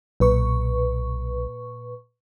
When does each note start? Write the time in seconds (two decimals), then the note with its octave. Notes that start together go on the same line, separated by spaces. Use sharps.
0.20 B1 A#2 B4 C#6